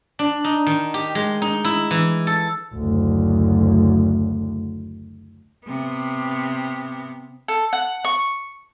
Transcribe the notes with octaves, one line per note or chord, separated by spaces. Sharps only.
D4
D#4
D#3
G4
G#3
D#4
E4
E3
A4
F#1 D2
C3 B3
A4
F#5
C#6